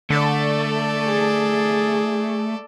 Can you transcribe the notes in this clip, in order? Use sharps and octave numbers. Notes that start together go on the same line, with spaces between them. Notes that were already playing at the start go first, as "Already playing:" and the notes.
D3 A3 A4 D5
G#4